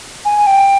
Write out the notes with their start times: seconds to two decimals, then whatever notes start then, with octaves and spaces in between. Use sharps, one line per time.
0.25 G#5
0.47 G5